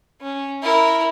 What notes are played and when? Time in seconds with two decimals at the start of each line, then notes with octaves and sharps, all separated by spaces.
0.21 C#4
0.63 E4 A#4